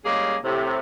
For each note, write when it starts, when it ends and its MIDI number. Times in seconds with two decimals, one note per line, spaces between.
0.05 0.36 55
0.05 0.36 56
0.05 0.36 58
0.05 0.36 61
0.05 0.36 68
0.44 0.79 45
0.44 0.79 48